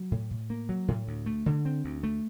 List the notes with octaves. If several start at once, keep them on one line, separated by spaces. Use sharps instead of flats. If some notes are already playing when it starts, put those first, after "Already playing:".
Already playing: F#3
A2
A2
A#3
F#3
A2
D2
A3
D3
C4
D2
A3